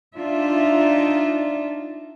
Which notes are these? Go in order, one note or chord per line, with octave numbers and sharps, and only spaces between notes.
D4 D#4 F4 E5